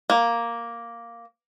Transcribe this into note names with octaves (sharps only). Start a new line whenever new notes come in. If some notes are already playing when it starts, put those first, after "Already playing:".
A#3